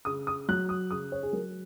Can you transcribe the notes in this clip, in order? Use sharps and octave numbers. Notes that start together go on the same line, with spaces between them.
C#3 D#6
D#6
F#3 F#6
D#6
C#3 D#6
C#5
G#4
F#3 A#4